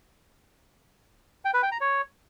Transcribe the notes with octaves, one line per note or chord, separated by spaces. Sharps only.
G5
B4
G5
A#5
C#5